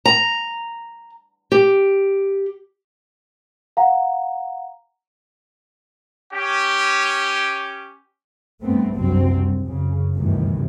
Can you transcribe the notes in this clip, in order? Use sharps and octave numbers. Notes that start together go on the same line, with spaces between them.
A#5
G4
F5 F#5 A#5
C#4 G4
G2 A3 B3 C4
F#1 C2 G2 C3 F#3 C4
G2
F#2 C#3
G1 D2 A2 C3 D#3 E3